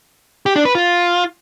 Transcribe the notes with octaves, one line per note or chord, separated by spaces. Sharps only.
G4
D4
B4
F4